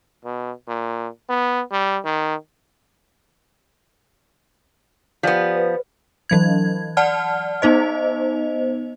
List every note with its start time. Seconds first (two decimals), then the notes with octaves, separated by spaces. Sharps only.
0.25 B2
0.68 A#2
1.29 B3
1.71 G3
2.05 D#3
5.23 F3 B3 G4 D5 G5
5.54 B4 C5
6.30 E3 F#3 G#6
6.97 D5 F#5 A5 F6
7.62 B3 D#4 C5 D#5